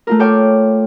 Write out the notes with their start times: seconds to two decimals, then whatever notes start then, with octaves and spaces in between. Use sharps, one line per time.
0.07 A3 F4 A#4
0.19 A4 C#5 F5 G5 C6 D6